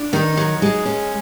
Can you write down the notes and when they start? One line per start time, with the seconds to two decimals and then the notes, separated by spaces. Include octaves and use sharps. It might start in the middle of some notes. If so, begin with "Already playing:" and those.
Already playing: D4
0.13 D#3 D#4
0.37 F#3
0.62 G#3
0.86 C#4